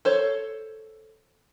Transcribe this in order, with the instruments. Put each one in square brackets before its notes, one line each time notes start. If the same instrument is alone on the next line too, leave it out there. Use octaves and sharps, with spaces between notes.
[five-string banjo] A4 C5 C#5